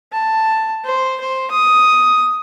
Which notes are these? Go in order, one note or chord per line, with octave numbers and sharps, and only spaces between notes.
A5
C5
C5
D#6